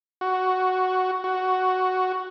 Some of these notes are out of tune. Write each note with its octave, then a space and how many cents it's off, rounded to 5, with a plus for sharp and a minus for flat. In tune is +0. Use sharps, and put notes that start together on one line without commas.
F#4 +5
F#4 +5